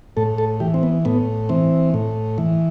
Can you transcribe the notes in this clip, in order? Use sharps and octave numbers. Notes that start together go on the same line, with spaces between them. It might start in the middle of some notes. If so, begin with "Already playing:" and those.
A2 A4
A4
E3 G4
C4
B3
A2 B3
E3 C4
A2
E3